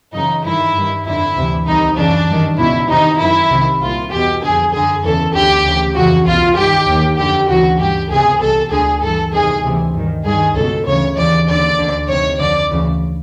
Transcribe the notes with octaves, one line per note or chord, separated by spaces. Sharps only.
F#2 C#3 E3 D#4
G2 D#3 E4
G2 D#3
F2 D3 E4
D2 C3 E3
C2 C3 D#3 D#4
F#2 C#3 E3 D4
G2 D#3
C#2 B2 E4
E2 C3 D#3 D#4
F#2 D#3 E4
C2 C3 D#3
C2 A#2 F4
E2 B2 G4
F2 D3 G#4
F#2 D3 G#4
E2 C#3 E3 A4
D2 D3 G4
D2 C#3 E3
F2 C#3 E3 F#4
C2 B2 F4
G2 D#3 G4
D#2 D#3
F2 D3 G4
D2 C#3 E3 F#4
G2 E3 G4
C#2 C3 E3 G#4
C2 B2 A4
D2 D3 G#4
G2 E3 A4
E2 C3 D#3 G#4
D2 C3 E3
G2 D#3
G2 D#3 G#4
C#2 B2 A4
D2 C#3 E3 C#5
D#2 C#3 E3 D5
D#2 D3 D5
D2 D3
F2 C3 D#3 C#5
F2 D3 D5
D2 C#3 E3